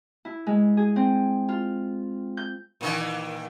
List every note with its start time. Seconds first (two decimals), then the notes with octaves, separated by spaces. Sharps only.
0.25 E4
0.47 G#3
0.77 G#4
0.96 C4
1.49 F4
2.37 G6
2.81 A#2 D#3 E3